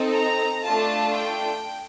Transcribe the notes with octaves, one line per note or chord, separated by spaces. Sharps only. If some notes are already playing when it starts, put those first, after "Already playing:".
Already playing: C4 D#4 A4
A#5
A3 D4 F4 A5
G5